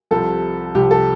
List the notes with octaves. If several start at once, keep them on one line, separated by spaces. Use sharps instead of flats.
C2 C3 F3 A4
C2 C3 F3 G4
A4